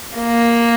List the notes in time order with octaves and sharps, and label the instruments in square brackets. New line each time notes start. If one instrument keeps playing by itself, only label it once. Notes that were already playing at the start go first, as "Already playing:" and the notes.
[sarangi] A#3